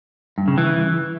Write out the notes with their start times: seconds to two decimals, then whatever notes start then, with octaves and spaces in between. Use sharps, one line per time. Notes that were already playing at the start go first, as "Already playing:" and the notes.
0.38 G2
0.48 C#3
0.58 E3